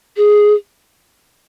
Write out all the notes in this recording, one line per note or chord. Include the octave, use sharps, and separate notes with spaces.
G#4